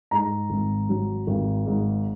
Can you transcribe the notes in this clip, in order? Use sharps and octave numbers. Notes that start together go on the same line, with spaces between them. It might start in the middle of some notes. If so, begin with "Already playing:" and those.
G#2 A#5
G#1
F#3
G#1
G#2